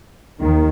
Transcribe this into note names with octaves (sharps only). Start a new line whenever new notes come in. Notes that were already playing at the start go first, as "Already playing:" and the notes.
D#2 D#3